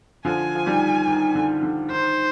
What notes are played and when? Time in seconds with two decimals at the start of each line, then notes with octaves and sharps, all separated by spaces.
0.25 D3 F3 G#5
0.55 F3
0.66 D#3 G3
1.07 D#3
1.35 D3
1.63 D3
1.90 D#3 C5